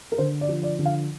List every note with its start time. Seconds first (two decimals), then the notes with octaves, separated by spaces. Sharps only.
0.12 A#4
0.18 D3 C5
0.41 D5
0.48 F3
0.63 D5
0.79 D3
0.85 F5